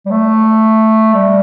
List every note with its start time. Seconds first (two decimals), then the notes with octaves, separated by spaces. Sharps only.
0.06 G3
0.11 A3
1.14 G3